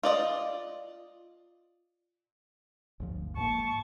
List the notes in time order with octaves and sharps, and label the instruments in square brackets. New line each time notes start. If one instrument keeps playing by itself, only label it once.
[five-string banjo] F4 D5 D#5
[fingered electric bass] G1 D2 F3
[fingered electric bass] G#2 A#3 [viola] A5 C#6